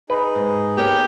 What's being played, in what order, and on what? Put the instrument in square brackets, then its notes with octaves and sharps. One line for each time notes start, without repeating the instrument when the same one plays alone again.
[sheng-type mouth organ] D#4 G#4 [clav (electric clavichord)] B4
[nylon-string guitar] G#2
[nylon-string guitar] B3 A#4 C#5 [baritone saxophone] G4